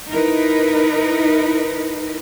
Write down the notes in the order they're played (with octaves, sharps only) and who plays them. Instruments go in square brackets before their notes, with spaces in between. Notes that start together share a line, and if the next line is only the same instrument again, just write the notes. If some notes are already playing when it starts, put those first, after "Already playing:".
[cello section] D#4 E4 A#4 B4